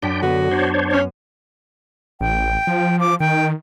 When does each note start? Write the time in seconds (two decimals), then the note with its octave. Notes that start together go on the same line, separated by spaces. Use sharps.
0.02 F#2 D4 G5 B6
0.23 D3 B3 F#4
0.51 D4 C5 C#5
0.93 C#4
2.21 A1 G5
2.67 F3
3.00 D6
3.20 D#3 G5